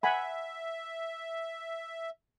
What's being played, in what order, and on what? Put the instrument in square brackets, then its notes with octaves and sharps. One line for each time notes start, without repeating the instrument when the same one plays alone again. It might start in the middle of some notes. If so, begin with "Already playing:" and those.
[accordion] E5 [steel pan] F#5 G#5 B5